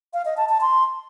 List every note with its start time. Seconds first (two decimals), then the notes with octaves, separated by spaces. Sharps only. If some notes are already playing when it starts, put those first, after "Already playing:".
0.13 F5
0.25 D#5
0.37 A5
0.49 A5
0.61 C6